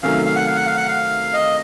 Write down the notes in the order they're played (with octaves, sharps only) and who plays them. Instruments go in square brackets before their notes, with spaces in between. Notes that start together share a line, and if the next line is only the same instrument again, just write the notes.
[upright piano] C3 D#3 F#3 A3 C#4 [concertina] F5
[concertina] F5
F#5
F5
F#5
F5
F#5
F5
D#5